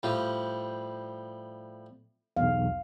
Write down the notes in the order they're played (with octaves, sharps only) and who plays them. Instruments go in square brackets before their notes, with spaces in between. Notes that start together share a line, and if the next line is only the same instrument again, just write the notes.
[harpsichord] A2 F3 G3
[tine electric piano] B1 E2 [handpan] F5